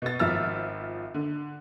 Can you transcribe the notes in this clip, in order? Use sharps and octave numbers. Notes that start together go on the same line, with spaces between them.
B2 B3 A6
G#1 F3 E5 E6 F6 A6
D3